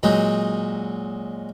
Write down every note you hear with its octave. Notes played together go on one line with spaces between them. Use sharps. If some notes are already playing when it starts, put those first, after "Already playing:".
A#2 F#3 G#3 D#4